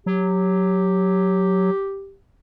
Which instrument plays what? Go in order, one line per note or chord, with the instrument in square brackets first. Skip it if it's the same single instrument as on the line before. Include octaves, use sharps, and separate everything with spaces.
[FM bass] F#3 [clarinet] G4